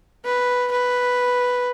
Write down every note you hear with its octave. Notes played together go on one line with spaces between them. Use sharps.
B4
B4